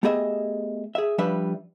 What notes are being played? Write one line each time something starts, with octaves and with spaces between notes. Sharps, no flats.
A3 B3 G4 G#4 D#5 E5
G#4 E5
F3 G3 D4 B4 E5